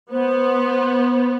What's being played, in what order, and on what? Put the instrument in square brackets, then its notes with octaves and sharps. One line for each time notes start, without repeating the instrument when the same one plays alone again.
[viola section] B3 [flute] C5